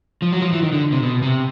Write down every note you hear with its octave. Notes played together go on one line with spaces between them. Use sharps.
F3
F#3
F3
E3
D#3
D3
C3
B2
C3